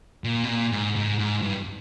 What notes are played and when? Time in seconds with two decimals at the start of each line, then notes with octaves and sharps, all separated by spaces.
0.24 A#2
0.44 B2
0.49 A#2
0.72 G#2
0.96 G#2
1.19 G#2
1.42 G2